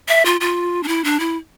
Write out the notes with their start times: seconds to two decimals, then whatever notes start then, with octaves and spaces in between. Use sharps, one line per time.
0.08 E5
0.25 F4
0.40 F4
0.83 D4
0.88 E4
1.04 D4
1.20 E4